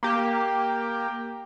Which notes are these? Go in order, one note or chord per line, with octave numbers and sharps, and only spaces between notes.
A#3 G4